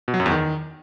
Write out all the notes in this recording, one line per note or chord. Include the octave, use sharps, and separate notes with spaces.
B2
F#3
F#2
E2
D#3